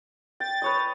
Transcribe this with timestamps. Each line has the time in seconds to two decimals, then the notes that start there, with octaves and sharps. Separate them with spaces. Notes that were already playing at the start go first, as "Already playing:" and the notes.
0.40 G5 A6
0.62 B4 C#5 D#5